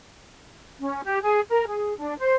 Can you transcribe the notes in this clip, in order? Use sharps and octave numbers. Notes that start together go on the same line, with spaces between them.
C#4
G4
G#4
A#4
G#4
D4
C5